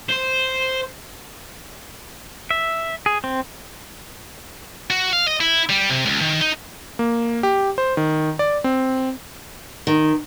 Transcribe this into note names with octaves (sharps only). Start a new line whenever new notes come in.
C5
E5
G#4
C4
F#4
F5
D#5
E4
G3
C3
C#2
D#3
D#4
A#3
G4
C5
D#3
D5
C4
D#3